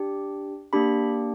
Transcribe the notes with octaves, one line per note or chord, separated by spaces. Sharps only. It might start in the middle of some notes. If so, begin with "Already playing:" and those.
Already playing: D4 G4
A#3 D4 G4 B5